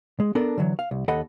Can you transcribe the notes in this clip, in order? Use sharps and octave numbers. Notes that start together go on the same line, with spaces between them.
G#3
B3 D4 A4 A#4
D3 E3 F#3
F5
C2
D#2 A4 D#5 F#5 B5